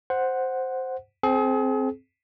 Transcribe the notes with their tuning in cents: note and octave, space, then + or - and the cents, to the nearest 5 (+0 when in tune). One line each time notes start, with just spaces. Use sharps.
C5 +0 F#5 +0
C4 +0 G#4 +40